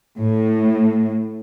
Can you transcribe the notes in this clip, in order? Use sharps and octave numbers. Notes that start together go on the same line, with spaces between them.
A2